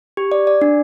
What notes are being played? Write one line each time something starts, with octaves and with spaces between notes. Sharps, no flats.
G4
D5
D5
D4